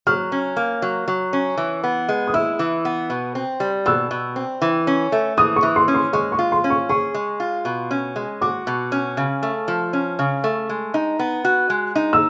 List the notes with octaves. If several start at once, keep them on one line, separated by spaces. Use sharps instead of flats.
F#3 F6
C#4
A#3
F#3
F#3
C#4
E3
B3
G#3
D#6
E4 E6
E3
B3
B2
C4
G3
B2 E6
B2
C4
E3
C#4
A3
E3 D#6
C#6
E3
C6
C#4
C6
G#3 C#6
C#6
F4
C6
C#4
C#6
G#4 C#6
G#3
F4
B2
C#4
G#3
F#4 D6
B2
C#4
C#3
A3
F3
C#4
C#3
A3
G#3
D#4
B3
F#4
G#3
D#4
E6